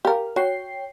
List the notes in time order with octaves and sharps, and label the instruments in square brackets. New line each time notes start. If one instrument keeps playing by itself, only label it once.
[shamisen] G4 A#4 [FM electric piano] F5
[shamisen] F#4 [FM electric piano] C#5 G5 C7